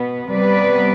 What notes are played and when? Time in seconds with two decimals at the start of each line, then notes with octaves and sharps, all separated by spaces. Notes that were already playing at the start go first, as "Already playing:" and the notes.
Already playing: B2 B3
0.31 C3 G3 B3 B4 D5